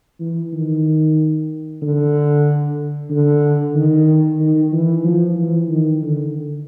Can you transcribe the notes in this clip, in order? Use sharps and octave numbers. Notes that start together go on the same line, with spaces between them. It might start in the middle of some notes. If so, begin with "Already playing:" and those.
E3
D#3
D3
D3
D#3
D#3
E3
F3
E3
D#3
D3